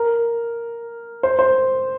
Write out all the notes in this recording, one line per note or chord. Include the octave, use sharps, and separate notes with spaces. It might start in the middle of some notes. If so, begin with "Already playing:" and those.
Already playing: A#4
C5
C5